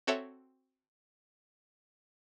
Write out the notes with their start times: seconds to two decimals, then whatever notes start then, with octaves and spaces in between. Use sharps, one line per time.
0.07 C4 F#4 A4 C#5 E5